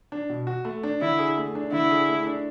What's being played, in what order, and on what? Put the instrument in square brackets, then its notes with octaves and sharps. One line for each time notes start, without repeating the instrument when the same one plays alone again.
[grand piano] D4
B2
F#4
A3
D4
[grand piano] D3 [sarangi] E4
[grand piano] G#4
A3
D4
[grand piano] D3 [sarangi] E4
[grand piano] G#4
A3
D4